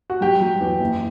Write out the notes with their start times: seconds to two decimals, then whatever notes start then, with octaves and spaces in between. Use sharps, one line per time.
0.10 F#4
0.21 F#3 G4
0.41 F#3
0.60 E2
0.80 F#1